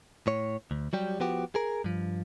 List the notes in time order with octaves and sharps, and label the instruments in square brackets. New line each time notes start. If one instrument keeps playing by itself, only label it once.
[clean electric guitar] A2 C#5
D2
F#3 G3 G4
F3 B3 F#4 G4
G#4 A#4
G2 F3